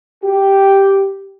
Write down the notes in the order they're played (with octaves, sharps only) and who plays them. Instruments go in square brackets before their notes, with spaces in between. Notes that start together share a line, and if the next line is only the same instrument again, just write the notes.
[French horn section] G4